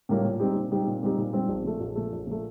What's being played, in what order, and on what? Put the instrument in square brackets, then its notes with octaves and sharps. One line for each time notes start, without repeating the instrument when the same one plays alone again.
[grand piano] A2 G3 A#3 F4
A#2
G3 C4 D#4 G4
A#2
G3 C4 D#4 G4
A#2
G3 C4 D#4 G4
A#2
G3 C4 D#4 G4
A#1
A#2 A3
A#1
A#2 A3
A#1
A#2 A3